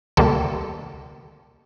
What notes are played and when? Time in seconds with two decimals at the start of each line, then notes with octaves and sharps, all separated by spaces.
0.17 D2 C3 D#3 G3 A#3 A4 A5